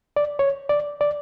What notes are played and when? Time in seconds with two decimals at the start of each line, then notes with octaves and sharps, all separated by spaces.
0.17 D5
0.39 C#5
0.69 D5
1.01 D5